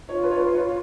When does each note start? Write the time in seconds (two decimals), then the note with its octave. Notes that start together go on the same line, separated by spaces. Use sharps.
0.09 F4 C#5
0.24 B4
0.31 C#5
0.39 B4
0.53 C#5